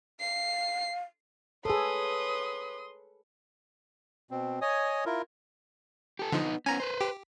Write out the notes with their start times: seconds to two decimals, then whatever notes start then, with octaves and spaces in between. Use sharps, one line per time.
0.20 F5 C7
1.65 G#4 A4 B4 C#5 C6 D#6
4.31 B2 C4
4.61 C#5 D#5 G#5 D#6
5.06 E4 F4 A#4
6.19 G4 A4
6.32 D3 F3 B3 D#4
6.66 B3 C#4 G#5 A#5
6.80 B4 C5
7.01 G4